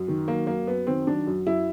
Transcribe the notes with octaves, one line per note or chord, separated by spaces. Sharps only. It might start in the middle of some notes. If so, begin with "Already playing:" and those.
Already playing: F#2
D#3
F#3 A#3
F#2 A#3
F#2 B3
D#3 C4
F#3 D4
F#2
F#2 E4